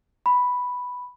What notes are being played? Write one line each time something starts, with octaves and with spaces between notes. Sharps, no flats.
B5